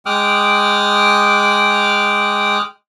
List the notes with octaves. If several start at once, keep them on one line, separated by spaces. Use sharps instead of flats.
G#3 G5 D6 D#6 F6 F#6